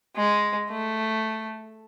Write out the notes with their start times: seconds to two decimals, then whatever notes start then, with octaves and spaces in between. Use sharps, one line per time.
0.16 G#3
0.70 A3